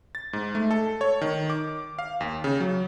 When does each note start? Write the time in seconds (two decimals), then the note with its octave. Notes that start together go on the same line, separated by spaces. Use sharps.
0.15 A6
0.33 G#2
0.55 A3
0.71 A4
1.01 C#5
1.21 D#3
1.50 D6
1.99 F5
2.20 D#2
2.44 C#3
2.60 F#3